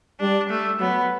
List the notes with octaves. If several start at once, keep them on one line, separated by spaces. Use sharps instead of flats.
G3 D4
A3
F#3 B3